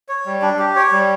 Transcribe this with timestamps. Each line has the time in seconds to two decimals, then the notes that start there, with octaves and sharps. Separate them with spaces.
0.09 C#5
0.26 G3
0.42 D4
0.59 G4
0.76 C#5
0.92 G3